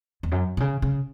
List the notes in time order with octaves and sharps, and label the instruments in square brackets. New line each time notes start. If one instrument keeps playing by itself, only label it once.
[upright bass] E2
F#2
B2
C#3
C#3